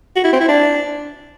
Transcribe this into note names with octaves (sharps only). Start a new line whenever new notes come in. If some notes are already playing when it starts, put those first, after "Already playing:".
F#4
E4
C4
E4
D4